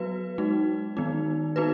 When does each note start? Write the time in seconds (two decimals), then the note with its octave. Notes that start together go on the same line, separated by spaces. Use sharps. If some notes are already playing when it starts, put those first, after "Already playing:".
Already playing: F#3 B3 F#4 B4
0.38 G#3 D#4 F#4
0.97 D#3 B3 D#4
1.56 B3 D#4 F#4 B4